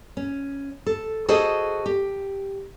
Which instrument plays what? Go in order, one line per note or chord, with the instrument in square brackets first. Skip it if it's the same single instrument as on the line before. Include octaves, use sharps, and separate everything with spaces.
[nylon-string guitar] C#4
A4
F#4 G#4 A4 C5 D#5
G4